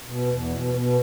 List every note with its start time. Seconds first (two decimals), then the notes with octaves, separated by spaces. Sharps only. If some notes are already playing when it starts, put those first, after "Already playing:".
0.07 B2
0.29 E2
0.52 B2
0.74 B2